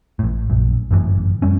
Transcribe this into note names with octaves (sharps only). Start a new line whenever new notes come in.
A1 A2
A#1 F#2
G1 F#2 A2 E3
F#2 G3 C#4